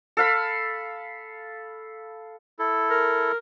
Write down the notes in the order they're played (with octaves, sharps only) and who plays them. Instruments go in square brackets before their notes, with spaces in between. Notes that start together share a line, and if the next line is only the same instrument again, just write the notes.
[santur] A4 F5 B5
[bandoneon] E4 A4
[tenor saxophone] A#4